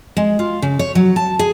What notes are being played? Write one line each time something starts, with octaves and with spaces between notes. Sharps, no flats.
G#3
F4
C#3
C#5
F#3
A5
G#4